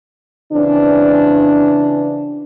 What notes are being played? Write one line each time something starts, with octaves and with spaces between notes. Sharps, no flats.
C#3 E3 C4 D4